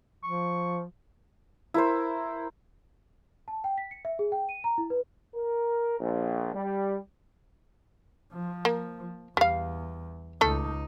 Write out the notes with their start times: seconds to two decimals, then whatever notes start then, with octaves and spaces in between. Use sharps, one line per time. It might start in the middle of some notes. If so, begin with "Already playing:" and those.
0.24 F3 C#6
1.74 E4 A#4 C5
3.48 A5
3.64 G5
3.78 B6
3.91 C#7
4.05 E5
4.19 G#4
4.32 G5
4.49 D#7
4.64 A#5
4.78 E4
4.90 B4
5.35 A#4
5.99 A#1
6.54 G3
8.32 F3
8.65 A#3
9.37 E2 G3 F5
10.41 C#2 A3 D#4 A4